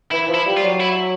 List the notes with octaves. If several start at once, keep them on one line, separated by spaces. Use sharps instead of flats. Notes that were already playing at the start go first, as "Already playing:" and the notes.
E3 E4
F3
E4
G3
F4
F#3
E4